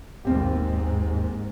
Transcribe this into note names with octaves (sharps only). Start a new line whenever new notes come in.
G#1 D#2 G#2 C4 G4